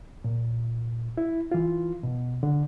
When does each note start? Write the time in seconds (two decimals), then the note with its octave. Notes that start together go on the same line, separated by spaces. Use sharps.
0.24 A#2
1.18 E4
1.52 E3 F4
2.03 B2
2.43 D3